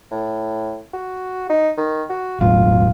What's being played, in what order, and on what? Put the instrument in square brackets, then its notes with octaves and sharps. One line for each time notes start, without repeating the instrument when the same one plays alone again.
[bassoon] A2
F#4
D#4
D#3
F#4
[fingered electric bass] E1 A2 F#3 [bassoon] F4